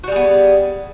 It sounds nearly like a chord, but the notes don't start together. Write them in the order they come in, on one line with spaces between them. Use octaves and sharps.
F#4 G3 G#4 B3